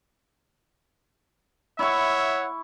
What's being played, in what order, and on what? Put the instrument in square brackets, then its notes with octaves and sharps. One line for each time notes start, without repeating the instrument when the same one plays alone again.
[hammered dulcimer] E4 C#6 [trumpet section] C#5 E5 F#5